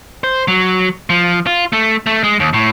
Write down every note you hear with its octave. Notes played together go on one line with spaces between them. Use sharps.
C5
F#3
F3
F4
A3
A3
G#3
D#2
A2